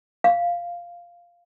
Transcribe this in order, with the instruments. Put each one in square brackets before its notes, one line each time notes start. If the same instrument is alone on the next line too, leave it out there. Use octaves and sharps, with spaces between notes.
[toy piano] F5